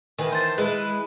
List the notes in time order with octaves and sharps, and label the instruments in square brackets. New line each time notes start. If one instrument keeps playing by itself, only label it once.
[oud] D#3 E3 [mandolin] G#4 B4
[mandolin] C5 A5
[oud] G#3 [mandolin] E4 B4